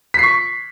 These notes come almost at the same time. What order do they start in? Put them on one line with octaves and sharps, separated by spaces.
B6 C7 C#6